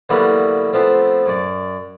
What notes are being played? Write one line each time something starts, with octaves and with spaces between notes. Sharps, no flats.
D3 E3 F#3 G3 A#3 B3
F3 A3 B3 C4
F#2 D5